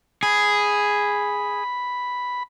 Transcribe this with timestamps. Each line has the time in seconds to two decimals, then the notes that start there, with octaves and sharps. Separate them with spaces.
0.23 G#4 B5